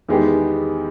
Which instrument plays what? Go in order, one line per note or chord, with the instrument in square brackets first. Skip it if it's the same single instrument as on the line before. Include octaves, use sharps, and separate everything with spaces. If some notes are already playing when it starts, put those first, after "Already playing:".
[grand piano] E2 D#3 G#3 B3 G4